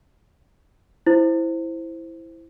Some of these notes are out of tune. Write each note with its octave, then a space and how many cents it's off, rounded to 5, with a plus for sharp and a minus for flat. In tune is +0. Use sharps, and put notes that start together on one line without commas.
E4 +0 C5 +0